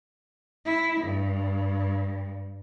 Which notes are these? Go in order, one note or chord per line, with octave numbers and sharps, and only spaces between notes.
E4
G2